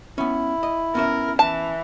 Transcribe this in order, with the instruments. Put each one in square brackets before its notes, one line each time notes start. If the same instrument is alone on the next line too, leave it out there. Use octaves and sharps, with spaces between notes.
[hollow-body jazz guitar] B3 C#4 [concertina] E4
[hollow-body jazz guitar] D#5
[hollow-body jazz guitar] B3 C#4 E5 [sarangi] A#4
[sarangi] E3 [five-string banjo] A5